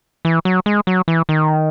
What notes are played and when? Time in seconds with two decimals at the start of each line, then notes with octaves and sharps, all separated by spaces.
0.25 E3
0.45 F#3
0.66 G#3
0.87 F#3
1.08 E3
1.29 D#3